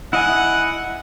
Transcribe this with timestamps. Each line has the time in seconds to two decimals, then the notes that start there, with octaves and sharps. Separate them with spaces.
0.13 E4 D#5 F#5 G#5